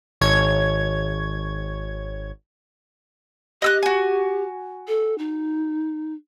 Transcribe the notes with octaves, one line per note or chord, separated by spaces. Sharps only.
G#1 C#5 G#6
G4 D#5 E6 F#6
F#4 G#5
A4
D#4